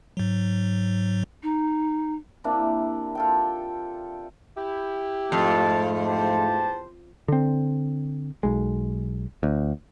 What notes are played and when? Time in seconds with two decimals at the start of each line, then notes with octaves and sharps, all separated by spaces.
0.17 G#2 F#3
1.43 D#4
2.44 C3 A#3 D4 E4
3.15 F4 A4 G5
4.56 E4 G4
5.32 F2 G#2 A3 F4 A5
6.06 E2 G4 C5 A5
7.28 D3 C4
8.43 B1 G#3
9.43 D2